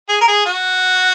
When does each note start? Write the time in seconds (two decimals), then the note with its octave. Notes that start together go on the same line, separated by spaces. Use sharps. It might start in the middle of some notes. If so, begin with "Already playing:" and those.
0.09 G#4
0.21 A#4
0.28 G#4
0.46 F#4